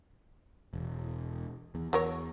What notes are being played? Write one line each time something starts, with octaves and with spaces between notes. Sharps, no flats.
E1
E2
E2 F#3 A#4 C#5